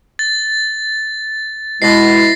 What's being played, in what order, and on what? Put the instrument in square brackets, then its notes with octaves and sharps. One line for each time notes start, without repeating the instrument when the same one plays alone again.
[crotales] A6
[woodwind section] B2 G#3 [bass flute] E4 [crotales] A6 A#6 C7